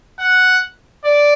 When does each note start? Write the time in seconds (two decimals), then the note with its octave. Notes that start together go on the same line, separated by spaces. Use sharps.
0.19 F#5
1.04 D5